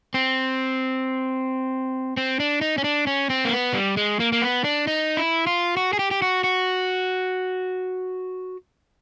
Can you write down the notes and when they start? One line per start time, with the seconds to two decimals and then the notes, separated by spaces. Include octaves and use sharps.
0.14 C4
2.17 C4
2.40 D4
2.61 D#4
2.78 C#4
2.84 D4
3.07 C#4
3.30 C4
3.45 A#3
3.53 B3
3.74 G3
3.97 G#3
4.20 A#3
4.32 A#3
4.42 B3
4.64 D4
4.87 D#4
5.17 E4
5.47 F4
5.77 F#4
5.93 G#4
5.99 G4
6.11 G4
6.22 F#4
6.44 F#4